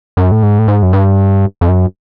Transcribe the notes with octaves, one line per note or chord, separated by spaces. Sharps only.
F#2
A2
G#2
A2
G#2
F#2
G2
F2
F#2